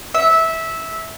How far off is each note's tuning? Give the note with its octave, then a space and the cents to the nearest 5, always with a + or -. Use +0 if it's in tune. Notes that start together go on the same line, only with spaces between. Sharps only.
E5 -15